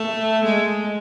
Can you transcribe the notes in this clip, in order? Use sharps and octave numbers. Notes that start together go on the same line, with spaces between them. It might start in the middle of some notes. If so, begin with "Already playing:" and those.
Already playing: A3
G#3